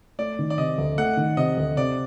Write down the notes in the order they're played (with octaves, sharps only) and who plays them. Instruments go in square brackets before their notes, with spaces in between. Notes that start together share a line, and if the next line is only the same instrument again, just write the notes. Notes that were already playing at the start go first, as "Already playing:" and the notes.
[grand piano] A3 [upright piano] D5
[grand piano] D#3
[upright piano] D5
[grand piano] C3 [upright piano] D#5
[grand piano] D2
[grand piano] A3 [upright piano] F#5
[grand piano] D#3
[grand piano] C3 [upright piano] D#5
[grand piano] D2
[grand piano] C3 [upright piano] D5